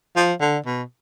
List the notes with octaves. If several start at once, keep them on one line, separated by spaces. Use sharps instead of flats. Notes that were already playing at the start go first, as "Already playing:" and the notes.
F3
D3
B2